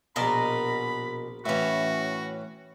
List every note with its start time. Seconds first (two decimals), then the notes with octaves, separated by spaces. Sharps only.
0.16 A#1 B2 A#4 D5 D#5 B5 C6
1.45 A2 E3 C#4 F#4 E5